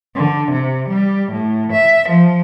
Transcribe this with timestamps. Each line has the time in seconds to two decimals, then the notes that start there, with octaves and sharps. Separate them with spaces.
0.15 D3
0.51 C3
0.88 G3
1.32 A2
1.72 E5
2.09 F3